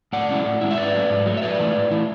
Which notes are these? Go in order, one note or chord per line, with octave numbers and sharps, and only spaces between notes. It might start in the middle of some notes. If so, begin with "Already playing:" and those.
A2 D5 F#5
G#3 C#4 E4
A2
G#3 C#4 E4
E5
G#2 B4 D5
F#3 A3
G#2
F#3 A3
E5
A2 B4 D5
E3 A3 E4
A2
E3 A3 E4